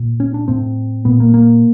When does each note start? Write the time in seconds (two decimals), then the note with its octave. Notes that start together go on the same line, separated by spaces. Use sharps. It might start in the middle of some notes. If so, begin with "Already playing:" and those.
Already playing: A#2
0.20 C#4
0.34 D4
0.48 A2 C4
1.05 A#2 B3
1.20 A#3
1.34 A#3